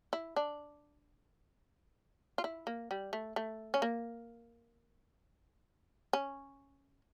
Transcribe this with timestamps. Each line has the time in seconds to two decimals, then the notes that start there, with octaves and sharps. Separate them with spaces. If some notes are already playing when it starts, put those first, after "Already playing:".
0.13 E4
0.36 D4
2.38 F4
2.44 E4
2.67 A#3
2.91 G3
3.13 A3
3.36 A3
3.74 C#4
3.82 A#3
6.13 C#4